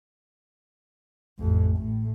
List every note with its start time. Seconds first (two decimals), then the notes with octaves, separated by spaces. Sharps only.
1.39 A1 F2
1.77 A2